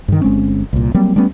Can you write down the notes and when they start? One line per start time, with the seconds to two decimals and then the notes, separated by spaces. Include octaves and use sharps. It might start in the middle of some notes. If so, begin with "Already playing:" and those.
0.08 G2 D#3
0.21 G1 G#3 C4 C#4
0.73 C2 A#2
0.94 F#3 G3 A#3 C4
1.16 G3 A3 B3 C#4